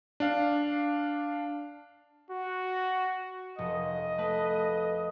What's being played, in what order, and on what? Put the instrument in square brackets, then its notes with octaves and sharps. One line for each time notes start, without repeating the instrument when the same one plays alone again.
[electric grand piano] D4 F5
[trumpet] F#4
[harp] F1 [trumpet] D#5
[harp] A3 B4